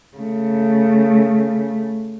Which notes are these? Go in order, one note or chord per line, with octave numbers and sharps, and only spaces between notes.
C#3 A3